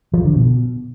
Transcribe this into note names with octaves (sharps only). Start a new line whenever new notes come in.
F3
D3
B2